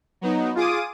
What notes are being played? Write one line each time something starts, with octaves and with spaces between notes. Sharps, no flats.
F#3 B3 D#4
F4 G#4 D6 D#6 D#7